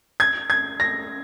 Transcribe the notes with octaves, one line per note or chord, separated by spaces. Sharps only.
G#6
G#6
A#6